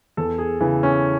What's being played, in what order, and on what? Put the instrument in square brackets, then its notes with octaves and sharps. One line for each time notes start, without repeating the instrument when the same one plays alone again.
[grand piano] E2 A4
G#4
C#3 E3
C#4